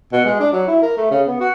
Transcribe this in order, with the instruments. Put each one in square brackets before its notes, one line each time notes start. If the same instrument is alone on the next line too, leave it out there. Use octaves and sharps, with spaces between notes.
[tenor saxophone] B2
G#3
D4
F#3
E4
A#4
A3
C#3
B3
F#4